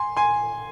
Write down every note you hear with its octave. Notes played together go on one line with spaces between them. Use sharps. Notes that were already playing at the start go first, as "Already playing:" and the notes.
Already playing: G#5 C6
G#5 C6